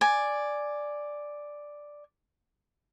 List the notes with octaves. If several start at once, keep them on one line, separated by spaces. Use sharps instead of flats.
D5 G#5